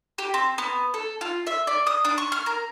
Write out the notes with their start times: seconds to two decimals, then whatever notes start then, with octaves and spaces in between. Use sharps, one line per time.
0.18 G4
0.34 C4
0.58 B3
0.94 A4
1.21 F4
1.47 E5
1.67 D5
1.87 D#6
2.05 D4
2.18 C#6
2.32 F6
2.46 A#4